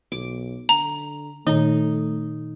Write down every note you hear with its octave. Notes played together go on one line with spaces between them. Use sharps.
B1 D6
D3 A#5
A#2 D#3 A3 D#4